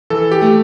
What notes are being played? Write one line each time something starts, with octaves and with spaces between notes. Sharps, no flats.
E3 A4
G4
A3